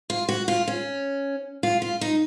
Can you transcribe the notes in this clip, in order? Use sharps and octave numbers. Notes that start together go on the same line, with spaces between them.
F4
F#4
F4
C#4
F4
F4
D#4